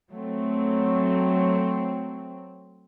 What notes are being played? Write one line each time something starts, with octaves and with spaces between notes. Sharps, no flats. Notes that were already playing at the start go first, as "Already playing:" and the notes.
F#3 A3 C4